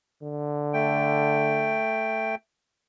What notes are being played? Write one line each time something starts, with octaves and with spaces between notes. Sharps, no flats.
D3
A3 G5